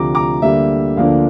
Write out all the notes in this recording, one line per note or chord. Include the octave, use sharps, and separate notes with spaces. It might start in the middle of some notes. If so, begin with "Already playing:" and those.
Already playing: D2 C3 F3 A#5 D6
A#5 D6
D2 D3 G3 A#3 E5
D2 D3 F3 A#3 D4 F5